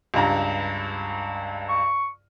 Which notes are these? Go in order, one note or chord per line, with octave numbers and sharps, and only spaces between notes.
C#2 G2 A#5
C#6